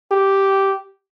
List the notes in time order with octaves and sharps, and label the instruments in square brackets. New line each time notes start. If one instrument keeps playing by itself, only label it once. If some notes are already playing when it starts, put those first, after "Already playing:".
[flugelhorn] G4